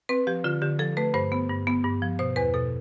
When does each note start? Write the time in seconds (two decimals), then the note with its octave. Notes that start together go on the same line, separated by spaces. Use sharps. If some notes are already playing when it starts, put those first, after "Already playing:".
0.09 C4 B4
0.27 F3 G4
0.44 D3 F4
0.62 D3 G4
0.79 F3 A4
0.97 A3 B4
1.14 G2 C5
1.32 B3
1.49 G2
1.67 B3
1.84 G2
2.02 F3
2.19 B2 C5
2.36 E2 B4
2.54 B2 A4